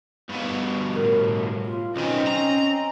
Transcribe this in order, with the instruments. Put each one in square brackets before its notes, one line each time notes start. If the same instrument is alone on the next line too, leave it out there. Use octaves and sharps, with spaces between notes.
[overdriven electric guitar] G2 B2
[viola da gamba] A2 [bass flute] A#4
[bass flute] F4
[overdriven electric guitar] B1 D#3 [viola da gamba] C4 D#5 [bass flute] C#4
[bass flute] C#4 [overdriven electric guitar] A#5